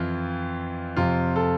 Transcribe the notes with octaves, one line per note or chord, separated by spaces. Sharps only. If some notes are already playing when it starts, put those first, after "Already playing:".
Already playing: F2 E3 F4
F2 C3 F3 F4
A4